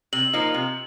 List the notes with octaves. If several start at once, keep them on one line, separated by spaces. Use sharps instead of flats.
C3 F#7
F3 A#3 D#4
C3